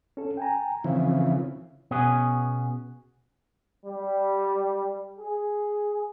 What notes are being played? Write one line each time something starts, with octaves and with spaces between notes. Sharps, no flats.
C#4 A4
G5 G#5 A#5
C#3 E3 F3 C4 E4
B2 B3 C#4 G#4
G3
G#4